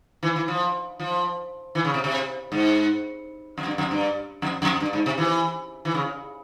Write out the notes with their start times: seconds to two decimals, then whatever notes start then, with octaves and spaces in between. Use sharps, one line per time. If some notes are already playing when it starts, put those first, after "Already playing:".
0.23 E3
0.36 E3
0.48 F3
1.00 F3
1.75 E3
1.85 C#3
1.94 C3
2.04 C3
2.52 G#2
3.58 F2
3.66 G2
3.78 F2
3.91 G2
4.42 F2
4.62 F2
4.80 G2
4.93 G#2
5.06 C3
5.18 E3
5.85 E3
5.95 C#3